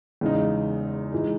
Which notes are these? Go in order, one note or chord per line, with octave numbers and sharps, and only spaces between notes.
E2 C#3 G#3 D#4
E3 G#3 D#4